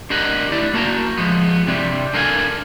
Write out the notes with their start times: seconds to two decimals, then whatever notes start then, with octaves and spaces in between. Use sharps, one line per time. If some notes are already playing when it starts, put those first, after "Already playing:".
0.10 D4 G4 A#4 B4 D#5 F#5
0.52 D2 E4 D5
0.74 A#3 F#4 A5 A#5
1.17 F3 G#3 B3
1.67 C3 G3 C4 D4
2.14 D4 A4 A#4 F5 F#5 G#5